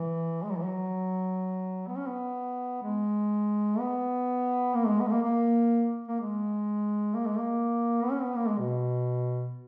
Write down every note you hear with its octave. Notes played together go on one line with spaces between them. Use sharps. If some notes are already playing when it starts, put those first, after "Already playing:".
Already playing: E3
G#3
F#3
E3
F#3
B3
C#4
B3
G#3
B3
A#3
G#3
B3
G#3
A#3
A#3
A#3
G#3
A#3
G#3
A#3
B3
C#4
B3
A#3
G#3
B2